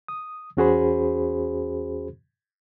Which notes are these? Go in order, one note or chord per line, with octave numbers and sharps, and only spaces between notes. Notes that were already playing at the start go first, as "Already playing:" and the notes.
D#6
E2 C#4 F#4 G#4 C5 B5